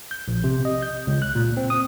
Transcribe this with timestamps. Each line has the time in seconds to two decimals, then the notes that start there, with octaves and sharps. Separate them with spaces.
0.11 G6
0.28 A#1
0.44 C3
0.65 D#5
0.82 G6
1.07 C#2
1.22 F#6
1.35 A#2
1.57 C4
1.70 D#6